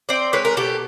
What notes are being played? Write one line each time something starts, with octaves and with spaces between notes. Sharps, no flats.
C4 C5 D5
G#3 B4 C#5
A#4
B2 G4 A4